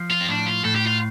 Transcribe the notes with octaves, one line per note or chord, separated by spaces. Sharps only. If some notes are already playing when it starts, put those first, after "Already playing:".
Already playing: F3
F4
C4
A2 D4
F4
A2 A4
G4
F4